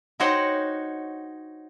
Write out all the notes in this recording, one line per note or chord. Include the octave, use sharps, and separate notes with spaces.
D#4 F#4 C5 C#5 F#5 G5